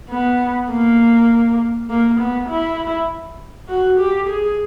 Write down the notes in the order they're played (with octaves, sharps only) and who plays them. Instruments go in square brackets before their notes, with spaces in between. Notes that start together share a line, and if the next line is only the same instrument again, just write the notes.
[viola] B3
A#3
A#3
B3
E4
F#4
G4
G#4